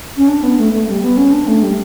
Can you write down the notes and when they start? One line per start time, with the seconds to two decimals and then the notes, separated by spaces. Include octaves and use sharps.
0.17 C#4
0.28 D4
0.43 B3
0.58 A3
0.73 A3
0.88 G3
1.02 B3
1.17 C#4
1.32 D4
1.47 A3
1.63 G3